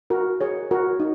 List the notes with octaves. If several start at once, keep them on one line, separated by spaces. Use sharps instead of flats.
F#4 A#4
G#4 C#5
F#4 A#4
D#4